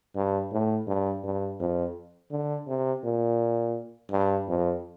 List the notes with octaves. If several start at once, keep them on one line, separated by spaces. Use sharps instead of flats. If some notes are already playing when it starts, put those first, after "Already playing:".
G2
A2
G2
G2
F2
D3
C3
A#2
G2
F2